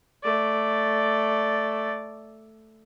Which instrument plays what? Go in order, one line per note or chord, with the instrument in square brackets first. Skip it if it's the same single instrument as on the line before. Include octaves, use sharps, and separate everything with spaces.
[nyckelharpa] A3 D5